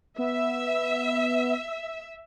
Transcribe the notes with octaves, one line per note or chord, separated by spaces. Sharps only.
B3 E5